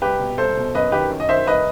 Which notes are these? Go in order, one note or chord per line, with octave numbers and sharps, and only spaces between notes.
C2 G4 B4
B2
C2 A4 C5
B2
F#2 B4 D#5
D#3 G4 B4
F#2
D#5
D#3 C5 E5
C2 B4 D#5